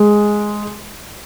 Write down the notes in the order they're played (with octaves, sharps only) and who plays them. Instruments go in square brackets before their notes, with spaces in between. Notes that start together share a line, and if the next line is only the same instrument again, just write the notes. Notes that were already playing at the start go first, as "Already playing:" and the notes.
Already playing: [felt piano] G#3